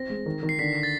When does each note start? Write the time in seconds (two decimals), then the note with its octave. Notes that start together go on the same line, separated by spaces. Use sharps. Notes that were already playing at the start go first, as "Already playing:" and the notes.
Already playing: C4 A#6
0.10 G#3
0.26 D#3
0.43 D#3
0.49 C7
0.59 D3 B6
0.83 A6